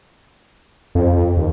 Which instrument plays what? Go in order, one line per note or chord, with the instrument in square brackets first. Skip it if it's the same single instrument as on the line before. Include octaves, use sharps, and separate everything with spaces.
[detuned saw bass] F2
D#2